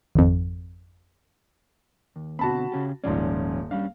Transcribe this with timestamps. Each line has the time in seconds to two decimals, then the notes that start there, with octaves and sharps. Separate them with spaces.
0.15 G#1 F2
2.16 D#2
2.39 B2 D3 C4 F#4 A5 B5
2.72 C#3 C#4 G4
3.04 D#1 G#2 F3 C#4 D5
3.71 G3 C#4 D4 F5